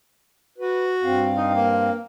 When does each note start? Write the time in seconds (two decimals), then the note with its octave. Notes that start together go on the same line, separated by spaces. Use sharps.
0.58 F#4 B4
1.03 G2 C4 F5
1.36 D#4
1.54 A#3